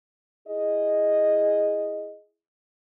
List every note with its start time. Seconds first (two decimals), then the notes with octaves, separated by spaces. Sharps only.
0.47 E4 G#4 D#5